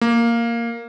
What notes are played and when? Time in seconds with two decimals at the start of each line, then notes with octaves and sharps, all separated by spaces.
0.01 A#3